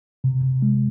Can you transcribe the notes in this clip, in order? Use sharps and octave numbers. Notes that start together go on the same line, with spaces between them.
C3
C3
G#3